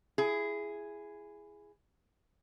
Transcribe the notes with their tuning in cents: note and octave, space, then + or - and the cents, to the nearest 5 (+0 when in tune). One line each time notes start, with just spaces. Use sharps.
E4 +15 G#4 +0